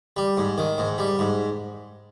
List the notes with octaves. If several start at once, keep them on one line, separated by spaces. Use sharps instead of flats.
G3
G#2
D#3
G#2
G3
G#2